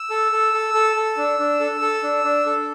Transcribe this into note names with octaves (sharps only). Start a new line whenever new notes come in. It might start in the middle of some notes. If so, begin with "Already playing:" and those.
Already playing: E6
A4
A4
A4
A4
A4
D4
D4
A4
A4
D4
D4
A4